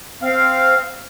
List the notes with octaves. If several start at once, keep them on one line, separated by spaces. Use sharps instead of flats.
C4 F5